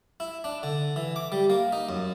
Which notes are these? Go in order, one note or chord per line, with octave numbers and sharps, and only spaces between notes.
E4
D4
D3
E3
D6
G3
A#3
D#4
F#2